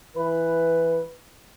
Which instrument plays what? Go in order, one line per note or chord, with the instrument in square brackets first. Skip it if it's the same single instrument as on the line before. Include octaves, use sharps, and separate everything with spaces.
[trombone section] E3 B4